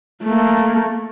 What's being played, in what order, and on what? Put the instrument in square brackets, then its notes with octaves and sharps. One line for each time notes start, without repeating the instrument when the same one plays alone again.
[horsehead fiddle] A3 A#3